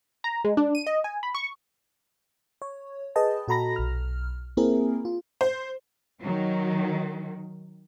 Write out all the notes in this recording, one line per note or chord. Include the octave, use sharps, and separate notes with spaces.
A#5
G#3
D4
D#7
D#5
G#5
B5
C#6
C#5
G#4 B4 D#5 G5 A5
A#2 F#4 A4 A#5 B5 A#6
B1 F6
A#3 C4 E4 G#4 A#4
F4
C5
D#3 F#3